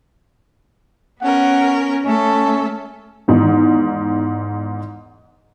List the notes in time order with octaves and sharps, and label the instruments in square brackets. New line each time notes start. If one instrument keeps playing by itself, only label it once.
[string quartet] B3 C#4 A#4 [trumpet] F#5
[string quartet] A3 A4 [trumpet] C#4
[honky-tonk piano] E2 G#2 D#3